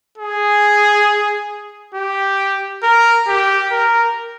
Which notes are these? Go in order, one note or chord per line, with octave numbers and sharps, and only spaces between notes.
G#4
G4
A#4
G4
A#4